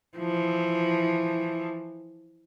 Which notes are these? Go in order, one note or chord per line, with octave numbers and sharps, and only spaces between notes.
E3 F3